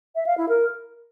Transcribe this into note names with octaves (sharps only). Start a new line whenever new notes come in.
E5
F5
E4
A#4